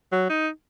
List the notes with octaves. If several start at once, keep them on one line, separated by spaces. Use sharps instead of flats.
F#3
D#4